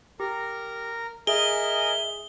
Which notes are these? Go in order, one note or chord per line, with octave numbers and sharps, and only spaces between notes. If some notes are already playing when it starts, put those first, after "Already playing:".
G4 A#4 A#5
G#4 A#4 D#5 E5 G#5 G7